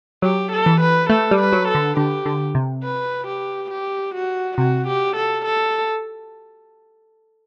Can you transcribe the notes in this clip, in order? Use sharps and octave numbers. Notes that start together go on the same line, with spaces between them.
F#3 G4
A4
E3
B4
A3 A4
G3
B4
F#3
A4
D3
D3 G4
D3
C3
B4
G4
G4
F#4
C3 F#4
G4
A4
A4